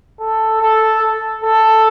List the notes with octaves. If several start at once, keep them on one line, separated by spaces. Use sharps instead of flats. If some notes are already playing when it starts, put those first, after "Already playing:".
A4
A4
A4